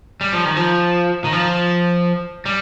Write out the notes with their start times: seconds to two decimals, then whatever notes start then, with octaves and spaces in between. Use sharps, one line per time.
0.21 G3
0.33 F3
0.45 D#3
0.57 F3
1.24 D#3
1.33 F3
2.46 G3